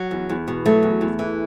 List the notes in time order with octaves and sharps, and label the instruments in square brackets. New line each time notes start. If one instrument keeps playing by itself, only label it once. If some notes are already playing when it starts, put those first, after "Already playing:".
Already playing: [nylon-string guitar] F#3
E2
E2
B2
F#3 A3
E2
E2
E3